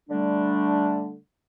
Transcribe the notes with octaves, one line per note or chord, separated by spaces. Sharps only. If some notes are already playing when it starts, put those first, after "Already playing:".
D3 G3 A3 D4